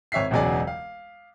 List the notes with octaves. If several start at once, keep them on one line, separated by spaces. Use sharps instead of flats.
G#1 C#5 E5 B6 C7
E1 C#2 B2 F#3 G#4 D5
F5